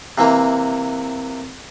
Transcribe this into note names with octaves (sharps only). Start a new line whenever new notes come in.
C3 E3 A#3